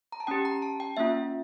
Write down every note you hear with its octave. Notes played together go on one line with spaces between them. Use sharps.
A#5
A5
C#4 G4 G5
A#5
A5
G5
A#3 C#4 F4 E5